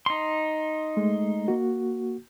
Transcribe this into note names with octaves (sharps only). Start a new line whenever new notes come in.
D#4 C6
G#3 A3
A#3 F#4